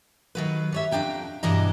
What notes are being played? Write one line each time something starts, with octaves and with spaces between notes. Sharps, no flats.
D#3 F#3 B4
G3 C#5 E5
F2 B3 D4 G5 A#5
G2 B2 E3 D4 D#5 A#5